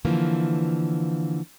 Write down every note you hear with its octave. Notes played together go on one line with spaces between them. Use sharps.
D3 E3 F3 A#3